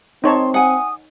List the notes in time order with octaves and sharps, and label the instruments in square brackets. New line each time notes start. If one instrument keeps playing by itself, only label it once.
[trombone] C4 [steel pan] D#4 C#5 A5 [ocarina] C6
[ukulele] F#5 G#5 [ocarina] D#6